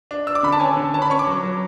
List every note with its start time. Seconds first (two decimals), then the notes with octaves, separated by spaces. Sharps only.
0.11 D4
0.27 D4 E6
0.35 D6
0.43 D3 B5
0.52 A5
0.60 C#4 G#5
0.77 D3
0.94 C#4 A5
1.02 B5
1.10 C#4 C#6
1.19 D6
1.27 F#3
1.43 F#3